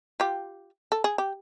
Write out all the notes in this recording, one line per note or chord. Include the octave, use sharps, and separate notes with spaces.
F4 G4
A4
G#4
G4